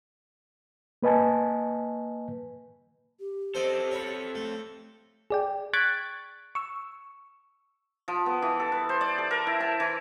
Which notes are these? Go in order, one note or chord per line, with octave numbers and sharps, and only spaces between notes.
A#3 B4 D#5 G#5 A5
G4
C4 A4 C5 D5 D#5
C#5 B5
A3
G#4 D5 G5
C#6 F#6 G#6 A6 B6 D7
C#6 E6
F3
B3
E3
A4
B4
C5
D5
A4
A#4
E4
A5
E3